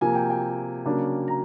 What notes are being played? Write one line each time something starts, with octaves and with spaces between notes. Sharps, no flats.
C3 F3 A#3 G#5
G5
G5
C#3 F#3 A#3 D4
A#5